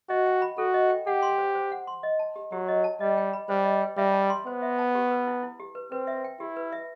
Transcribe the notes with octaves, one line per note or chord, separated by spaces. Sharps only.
F#4 D#5
G5
B5
F#4 A4
D#5
G5
G4 F#5
C6
C5
C5
F#5
C6
D#5
A5
G4
F#3 G4
D#5
A5
G3 D#5
G5
B5
G3 C5
D#5
G5
G3 E5
A5
C6
B3 C5
E5
A5
G4
B4
E4
E4
G4
B4
C4 B4
E5
G5
E4 G4
B4
E5